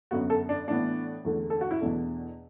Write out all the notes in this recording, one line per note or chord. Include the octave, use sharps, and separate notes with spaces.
F#2 D3 B3 F#4
A4
D4
A2 E3 B3 D4
E2 D3 A3
A4
F#4
E4
E2 B2 A3 D4